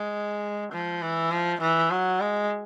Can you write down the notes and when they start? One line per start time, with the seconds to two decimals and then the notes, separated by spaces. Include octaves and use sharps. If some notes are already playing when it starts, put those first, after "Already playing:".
Already playing: G#3
0.72 F3
1.02 E3
1.31 F3
1.61 E3
1.91 F#3
2.20 G#3